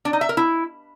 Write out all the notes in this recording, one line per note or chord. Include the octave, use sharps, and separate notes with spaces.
D4
D#4
E5
A#4
E4